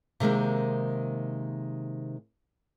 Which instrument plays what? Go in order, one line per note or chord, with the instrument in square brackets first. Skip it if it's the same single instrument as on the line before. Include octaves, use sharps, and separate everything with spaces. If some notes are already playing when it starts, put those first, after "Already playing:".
[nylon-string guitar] C3 D#3 G#3 A#3 C4